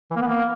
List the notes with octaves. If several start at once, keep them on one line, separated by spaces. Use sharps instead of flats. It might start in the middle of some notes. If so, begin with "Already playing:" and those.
E3
A#3
B3
A#3